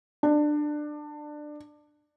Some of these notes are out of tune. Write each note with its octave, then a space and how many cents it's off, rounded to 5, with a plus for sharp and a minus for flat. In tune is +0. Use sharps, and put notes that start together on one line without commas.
D4 +20